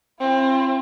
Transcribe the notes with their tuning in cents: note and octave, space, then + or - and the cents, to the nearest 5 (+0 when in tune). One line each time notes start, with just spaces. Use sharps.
C4 +30 F4 -45